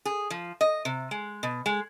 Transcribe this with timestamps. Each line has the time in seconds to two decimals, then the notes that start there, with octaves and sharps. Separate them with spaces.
0.05 G#4
0.30 F3
0.61 D#5
0.85 C3
1.11 G#3
1.43 B2
1.66 G#3